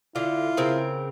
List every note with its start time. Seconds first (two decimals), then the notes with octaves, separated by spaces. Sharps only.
0.16 D3 E4 F4
0.57 C#3 C4 A#4